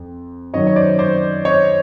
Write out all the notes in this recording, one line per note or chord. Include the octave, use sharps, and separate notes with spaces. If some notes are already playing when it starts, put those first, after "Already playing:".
Already playing: F2
F#2 D#3 F#3 C#5 D#5
C#5
C5 D5
C5 D5
C#5 D#5